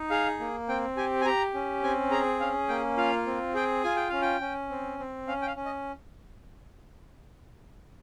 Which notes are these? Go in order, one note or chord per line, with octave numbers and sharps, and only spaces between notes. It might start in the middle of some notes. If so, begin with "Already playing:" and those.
Already playing: D#4
G#4 F5
A#3
C4 G5
G4 G#5
G#5
G4 A#5
C#4
C4 G#5
G#4 A#5
C#4 F5
A#3 G5
F4 F5
C4
G#4 G5
F4 G#5
G5
C#4 F5
G5
C#4
C4
C4
C#4 F5
G5
F5
C#4
D#5